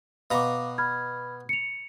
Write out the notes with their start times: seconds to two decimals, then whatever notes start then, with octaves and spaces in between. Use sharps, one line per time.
0.31 B2 F5 A#5 D6
0.78 B5 F6 G#6
1.49 C#7 F7